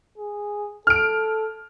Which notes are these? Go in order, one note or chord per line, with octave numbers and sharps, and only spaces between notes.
G#4
A4 F6 D7